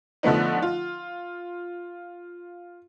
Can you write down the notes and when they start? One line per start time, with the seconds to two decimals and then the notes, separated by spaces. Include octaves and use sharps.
0.23 D3 F3 A3 B3 D#4
0.62 F4